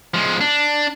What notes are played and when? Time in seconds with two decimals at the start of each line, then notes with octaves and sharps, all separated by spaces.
0.14 F3 G#3
0.41 D4